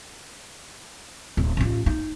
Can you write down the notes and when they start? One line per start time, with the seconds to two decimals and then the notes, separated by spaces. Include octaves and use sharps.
1.37 D1
1.57 A1 F4
1.86 D#4